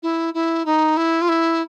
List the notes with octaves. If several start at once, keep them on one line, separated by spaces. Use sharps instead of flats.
E4
E4
D#4
E4
F4
E4